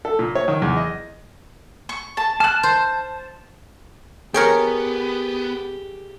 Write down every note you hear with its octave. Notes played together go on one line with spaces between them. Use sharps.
A4
A#2
C#5
D#3
E2
D#5
C#6
A5
A5 F6 F#6
C5
B3 G4 G#4 A#4 C#5 G5